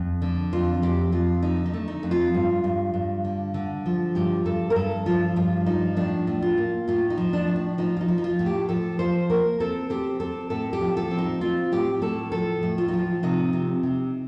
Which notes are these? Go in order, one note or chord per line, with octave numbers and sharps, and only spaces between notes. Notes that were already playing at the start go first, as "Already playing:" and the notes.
Already playing: F2
D3
F2 F4
F2 G4
F2 F4
D3 D#4
D#4
A3
D#4
F2
F4
G2
G2
G2
D3
D3
F3
G2 G4
G2 A4
A#4
G2 A4
F3 F4
G2 F4
F3 D#4
A2 D4
A2
F4
A#3
A2 F4
D#4
F3
D4
A2
D4
F3 D#4
F4
D#4
F3
D#4
F4
A2
G4
F3 A4
F3 C5
A#3 A#4
C4 A4
C4 G4
C4 A4
A2 A4
G4
F3
A4
C4
D#4
C4 F4
A2 G4
A2 A4
F3 A4
A2
F4
D#4
F3
F4
C3 D#4
C3
C3